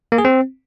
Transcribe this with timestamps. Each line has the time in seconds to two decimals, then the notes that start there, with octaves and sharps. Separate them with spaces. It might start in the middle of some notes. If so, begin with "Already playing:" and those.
0.12 A#3
0.18 G#4
0.25 C4